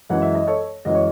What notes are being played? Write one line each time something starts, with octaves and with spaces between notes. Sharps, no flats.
F#2 E3 G#3 F#5
E5
D#5
A4 C#5
F#2 E3 G#3 D#5
C#5